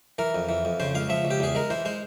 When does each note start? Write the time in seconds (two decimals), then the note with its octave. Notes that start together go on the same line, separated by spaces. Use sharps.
0.18 E3 A#4
0.35 F2
0.49 E3
0.65 F2
0.80 C#3 C5
0.95 C#2 F5
1.09 F3 E5
1.25 C#2
1.31 G4
1.40 E2 G#4
1.55 G#3 A#4
1.70 E3 C5
1.85 G#3 C5